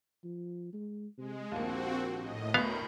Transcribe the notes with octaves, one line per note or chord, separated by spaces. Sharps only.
F3
G#3
C3 G#3
A#1 D#2 A#3 C4 F#4
A2 D#5
D2 A2 B3 A#4 F5